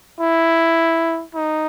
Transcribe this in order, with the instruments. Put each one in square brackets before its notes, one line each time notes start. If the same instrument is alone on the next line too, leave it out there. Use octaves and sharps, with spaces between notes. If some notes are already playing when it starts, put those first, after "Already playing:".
[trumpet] E4
D#4